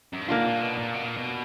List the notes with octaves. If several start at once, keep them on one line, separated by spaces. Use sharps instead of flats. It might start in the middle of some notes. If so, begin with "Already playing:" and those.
F#2
G2
G#2 A#3 D4 F4
A#2
B2
A#2
B2
A#2
B2